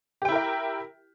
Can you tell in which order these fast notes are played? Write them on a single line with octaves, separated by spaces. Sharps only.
G4 G5 E4 A#4 E5